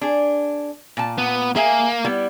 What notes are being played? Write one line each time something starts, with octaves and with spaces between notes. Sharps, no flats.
D4 G#4
A#2 A5
B3
A#3 G#4 E5 G#5
G3 B3 E4